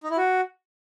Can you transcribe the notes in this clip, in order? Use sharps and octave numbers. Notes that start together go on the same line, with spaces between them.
D#4
E4
F#4